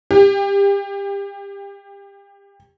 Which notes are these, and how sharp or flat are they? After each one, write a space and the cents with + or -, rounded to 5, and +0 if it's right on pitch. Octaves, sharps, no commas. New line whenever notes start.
G4 +30